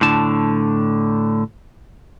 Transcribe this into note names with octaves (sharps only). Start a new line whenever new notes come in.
A2 D3 A5